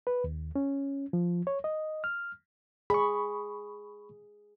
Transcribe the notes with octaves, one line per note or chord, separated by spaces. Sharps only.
B4
D#2
C#4
F3
C#5
D#5
F6
G#4 B5 C#6